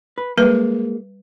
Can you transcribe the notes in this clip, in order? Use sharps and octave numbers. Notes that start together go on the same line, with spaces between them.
B4
G3 G#3 A#3 B4